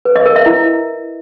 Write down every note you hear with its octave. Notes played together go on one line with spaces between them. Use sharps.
B4
D#5
A#4
E5
E4